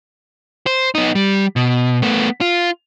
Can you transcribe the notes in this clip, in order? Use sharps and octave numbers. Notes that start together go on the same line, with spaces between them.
C5
B3 D#4
G3
B2
A3 B3
F4